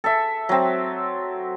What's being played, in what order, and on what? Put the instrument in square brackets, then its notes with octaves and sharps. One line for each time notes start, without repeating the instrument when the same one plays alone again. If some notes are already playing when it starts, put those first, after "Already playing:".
[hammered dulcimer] A4 E5
F#3 C4